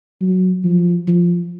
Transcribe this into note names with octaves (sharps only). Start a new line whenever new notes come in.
F#3
F3
F3